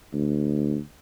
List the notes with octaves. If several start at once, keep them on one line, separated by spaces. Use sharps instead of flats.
D2